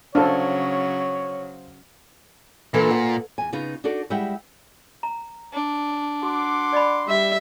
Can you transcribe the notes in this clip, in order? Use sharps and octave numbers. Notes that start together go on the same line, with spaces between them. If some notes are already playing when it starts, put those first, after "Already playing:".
C#3 F#3 D4 A4 C5 C#5 F5 F6
A#2 E3 D4 A4
F#5
E2 G#5
C#3 B3 D#4 F4
D4 D#4 F#4 A4 D5
G3 G#3 E4 E5 F#5 G5
A#5
D4
F#4 F#5 C6 D6
D5 D#5 B5
G3 E5